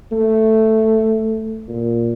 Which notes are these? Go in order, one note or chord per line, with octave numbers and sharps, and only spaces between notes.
A3
A#2